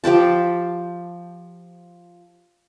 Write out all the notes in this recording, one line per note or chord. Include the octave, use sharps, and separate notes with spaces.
F3 G4 G5 A5